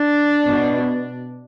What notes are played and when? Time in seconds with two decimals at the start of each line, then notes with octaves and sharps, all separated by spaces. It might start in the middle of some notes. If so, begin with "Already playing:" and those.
Already playing: D4
0.48 B2